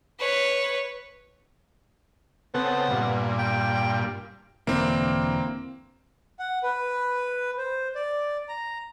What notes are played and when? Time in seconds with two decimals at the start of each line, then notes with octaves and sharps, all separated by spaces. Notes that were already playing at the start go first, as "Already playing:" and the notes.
0.19 B4 C#5
2.54 C#3 B3 C4 A4
2.90 G2 A#2
3.39 G5
4.67 E1 D3 E3 A#3 C4
6.39 F#5
6.63 B4
7.57 C5
7.95 D5
8.49 A#5